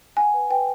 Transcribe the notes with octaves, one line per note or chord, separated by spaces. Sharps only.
F#5 G#5
B4
B4 G5